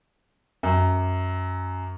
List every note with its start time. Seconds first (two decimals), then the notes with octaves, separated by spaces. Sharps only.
0.63 F#2